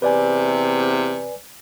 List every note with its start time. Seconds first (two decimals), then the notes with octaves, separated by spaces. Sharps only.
0.02 E2 C3 B4 D5 G#5